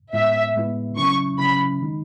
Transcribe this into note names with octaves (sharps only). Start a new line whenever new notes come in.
A2 G#3 B3 E4 E5
A2 G#3 B3 E4
C#3 F#3 C#4 E4 C#6
C#3 F#3 C#4 E4 B5
D#3 G#3 D#4